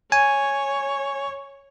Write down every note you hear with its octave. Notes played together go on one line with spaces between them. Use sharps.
C#5 G#5